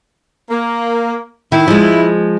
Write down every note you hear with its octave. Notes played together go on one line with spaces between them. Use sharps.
A#3
D#3 E4
F3 G#3